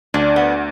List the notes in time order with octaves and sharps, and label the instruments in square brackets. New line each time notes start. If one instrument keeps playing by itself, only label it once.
[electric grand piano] D2 [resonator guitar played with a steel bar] D4
[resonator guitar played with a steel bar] B3